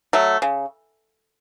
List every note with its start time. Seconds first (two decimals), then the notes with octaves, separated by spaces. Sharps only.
0.13 F#3 A3
0.42 C#3